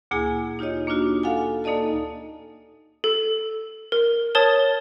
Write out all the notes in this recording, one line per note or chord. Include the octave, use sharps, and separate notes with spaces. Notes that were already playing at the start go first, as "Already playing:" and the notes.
D2 A#2 A#3 E4 G#4 G#5
D#4 F4 G4 C#5 D#5
A#3 D4 D#4 F4 F#4
A4 F5 F#5 G#5
A#3 D#4 A4 D5 D#5 A5
A4
A#4
A#4 C#5 A5 D#6 A6 G7